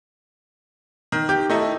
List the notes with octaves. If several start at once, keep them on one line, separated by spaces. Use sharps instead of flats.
D#3
G4 G6
A3 D#4 E4